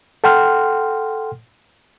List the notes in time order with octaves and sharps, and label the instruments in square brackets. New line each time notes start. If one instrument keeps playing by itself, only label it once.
[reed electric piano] A4 F#5 G5 C6 F6